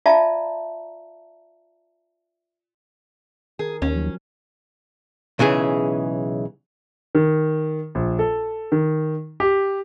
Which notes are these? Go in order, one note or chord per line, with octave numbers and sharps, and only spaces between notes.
F4 D5 E5 F5 A5 A#5
D#3 G#4 A#4
D#2 C#4
F3 F#3
B1 C#3 E3 G#4
D#3
A#1
A4
D#3
G4